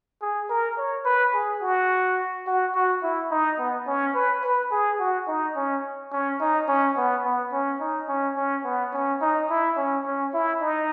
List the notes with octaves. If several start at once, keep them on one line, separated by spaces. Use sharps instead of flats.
G#4
A#4
C#5
B4
G#4
F#4
F#4
F#4
E4
D#4
B3
C#4
B4
B4
G#4
F#4
D#4
C#4
C#4
D#4
C#4
B3
B3
C#4
D#4
C#4
C#4
B3
C#4
D#4
E4
C#4
C#4
E4
D#4